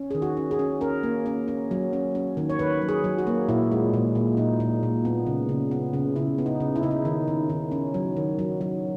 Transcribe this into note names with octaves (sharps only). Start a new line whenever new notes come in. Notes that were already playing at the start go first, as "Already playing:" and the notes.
Already playing: C#4
D#3 G#4
F#4
C#4
G#4
C#4
C#4 A#4
A#3
C#4
C#4
F#3
C#4
C#4
D#3
C#5
D#3 B4
F#3
G#4
F#3
F#4
A#3
A#2 E4
G#3
A#2
A#2
A#2 D#4
A#2
A#2
B3
C#3
C#3
B3
C#3
C#3 E4
B3
D#4
C#3
E4
C#3 D#4
E4
D#3
D#3
D#3
C#4
F#3
D#3
F#3
F#3